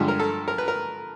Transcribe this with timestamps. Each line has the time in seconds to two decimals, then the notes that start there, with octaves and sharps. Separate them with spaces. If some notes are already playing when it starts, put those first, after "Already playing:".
Already playing: G2 D3 F3 G#3
0.08 A#4
0.20 A4
0.48 A#4
0.58 B4
0.68 A#4